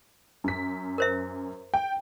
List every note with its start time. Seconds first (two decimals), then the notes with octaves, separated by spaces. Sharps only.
0.44 F#2 B6
0.98 A#4 C5 E5
1.74 G5